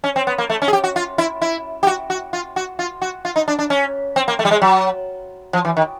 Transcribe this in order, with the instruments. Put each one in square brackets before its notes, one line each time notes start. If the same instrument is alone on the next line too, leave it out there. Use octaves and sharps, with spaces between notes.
[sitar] C#4
C4
B3
A#3
A3
C#4
G#4
G4
F#4
F4
E4
E4
G4
F#4
F#4
F4
F#4
F4
F#4
F4
D#4
D4
D4
C#4
C4
A#3
A3
G3
G#3
F#3
F3
E3
D#3